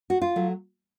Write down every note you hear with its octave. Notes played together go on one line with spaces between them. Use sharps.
F#4
F4
F#3 A3